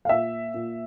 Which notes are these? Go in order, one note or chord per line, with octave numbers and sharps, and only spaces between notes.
F5
A#2 E5
A#2